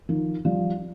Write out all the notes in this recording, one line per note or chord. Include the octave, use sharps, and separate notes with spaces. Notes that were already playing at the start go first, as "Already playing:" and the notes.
D#3 F3
F3 G3